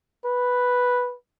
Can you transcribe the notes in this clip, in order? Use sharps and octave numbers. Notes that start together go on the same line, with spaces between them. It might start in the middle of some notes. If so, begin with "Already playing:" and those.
B4